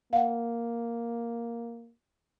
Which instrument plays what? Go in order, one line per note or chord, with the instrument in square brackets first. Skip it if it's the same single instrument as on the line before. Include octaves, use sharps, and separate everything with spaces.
[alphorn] A#3 [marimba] F5 F#5